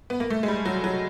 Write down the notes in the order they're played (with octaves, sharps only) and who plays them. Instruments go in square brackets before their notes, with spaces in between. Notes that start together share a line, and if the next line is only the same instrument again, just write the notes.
[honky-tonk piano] B3
A#3
A3
G#3
G3
F#3
F#3